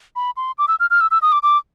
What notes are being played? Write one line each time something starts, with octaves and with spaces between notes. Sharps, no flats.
B5
C6
D6
E6
F6
F6
E6
E6
D#6
D6
D6